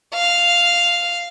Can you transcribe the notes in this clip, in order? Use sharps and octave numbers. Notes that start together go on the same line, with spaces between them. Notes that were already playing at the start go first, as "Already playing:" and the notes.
F5